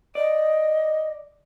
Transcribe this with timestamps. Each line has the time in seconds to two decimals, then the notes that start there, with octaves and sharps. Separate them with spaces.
0.15 D5 D#5